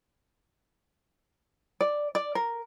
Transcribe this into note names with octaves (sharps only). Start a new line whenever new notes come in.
D5
D5
A#4